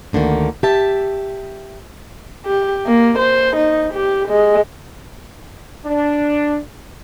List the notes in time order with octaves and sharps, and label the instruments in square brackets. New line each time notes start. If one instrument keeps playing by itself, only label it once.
[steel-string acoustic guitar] D2 D3 D#3 A#3
G4 E5 A5
[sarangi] G4
A#3
C5
D#4
G4
G#3
[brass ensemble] D4